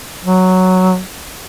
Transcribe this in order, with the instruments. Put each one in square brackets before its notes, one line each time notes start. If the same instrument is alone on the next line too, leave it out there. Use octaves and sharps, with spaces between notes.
[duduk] F#3